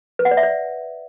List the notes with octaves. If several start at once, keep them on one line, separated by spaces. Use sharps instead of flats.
B4
F#5
D5
E5
D5